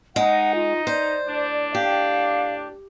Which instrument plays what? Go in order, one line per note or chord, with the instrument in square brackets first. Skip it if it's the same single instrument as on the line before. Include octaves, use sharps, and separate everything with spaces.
[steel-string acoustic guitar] G#3 [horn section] D#4 [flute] F#5
[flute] F4
[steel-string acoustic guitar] C5 [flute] D5
[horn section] A2 D4
[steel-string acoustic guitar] G4 [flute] F5